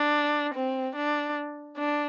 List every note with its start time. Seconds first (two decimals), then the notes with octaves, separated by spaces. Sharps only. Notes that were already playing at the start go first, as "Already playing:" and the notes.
Already playing: D4
0.54 C4
0.95 D4
1.77 D4